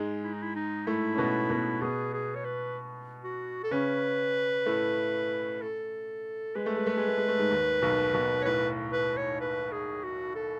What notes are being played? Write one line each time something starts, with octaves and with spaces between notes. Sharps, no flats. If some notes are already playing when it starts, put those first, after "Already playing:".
Already playing: G#2 G#3
E4
D#4
E4
D#4
A2 A3 E4
C#4
B2 B3
B2 B3
B2 B3 G#4
G#4
C#5
B4
F#4
A4
C#3 C#4 B4
A2 A3
A4
G#3 B4
A3
G#3
A3
G#3
A3
G#3
A3
G#2 G#3
D#2 D#3
B1 B2
B1 B2
C#5
A2 B4
B4
C#5
B4
G#4
F#4
A4